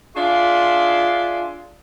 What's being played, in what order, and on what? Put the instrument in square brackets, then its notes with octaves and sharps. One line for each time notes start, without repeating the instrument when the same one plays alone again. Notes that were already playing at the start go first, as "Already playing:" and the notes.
[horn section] D4 F4 G#4 D5 E5 C6